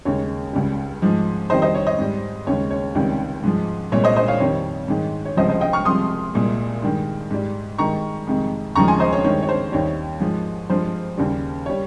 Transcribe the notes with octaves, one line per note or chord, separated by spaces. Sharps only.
D#2 C#3 G#3 C#5
C#2 C#3 G3
G#2 F3 G#3
F2 D#3 G3 C5 D#5
C5 D#5
C#5
C5 D#5
G#2 G3
D#2 C#3 G#3 C#5
C#5
C#2 C3 D#3 G3
G#2 F3 G#3
C2 A#2 G#3 C#5
C5 D#5
C5 D#5
C#5 F5
F2 D#3 G3 C#5
G#2 D#3 G#3
C#5
C#2 C3 F3 G#3 C5 D#5
C5 D#5
D#5 G5
C#6 F6
C2 C3 F3 G#3 C6 D#6
C2 A#2 G#3
G2 D#3 G#3
G#2 G3
G2 D#3 G#3 A#5 C#6
F2 C3 D#3 G#3
D#2 C#3 F3 G#3 A#5 C#6
G#5 C6
C5 D#5
C#5
G2 D#3 G#3 C#5
C#5
C5
D#2 D#3 G3 C#5
G#2 F3 G#3
G2 F3 G#3 C5
D#2 C#3 G3
G3 C#5